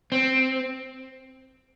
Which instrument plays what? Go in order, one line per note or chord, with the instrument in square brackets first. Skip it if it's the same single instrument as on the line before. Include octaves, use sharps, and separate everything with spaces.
[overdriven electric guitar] C4